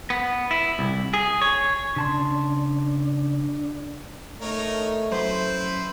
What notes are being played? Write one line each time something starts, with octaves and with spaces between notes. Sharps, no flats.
B3
E4
C2
G#4
C#5
C#3 D4 A5 C6
A3 D#4 A#4 C#5
F#2 E4 B4 C5